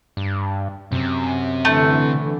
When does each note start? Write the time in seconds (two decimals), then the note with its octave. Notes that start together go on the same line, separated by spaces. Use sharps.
0.17 G2
0.92 F#2 C3 C4
1.65 D3 E3 A3